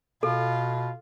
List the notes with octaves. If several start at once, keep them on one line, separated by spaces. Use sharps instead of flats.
B2 F4 A4